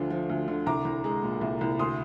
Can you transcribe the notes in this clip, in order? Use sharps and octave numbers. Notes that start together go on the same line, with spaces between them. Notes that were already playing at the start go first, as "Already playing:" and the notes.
Already playing: D2 D3 F3
F3
D2
D3
C2 A#5 D6
C2
G#3
A#2
C2
C2
D2 C6 D#6